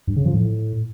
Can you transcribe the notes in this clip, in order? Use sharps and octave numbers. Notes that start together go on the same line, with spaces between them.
G2
C#3
F3
A2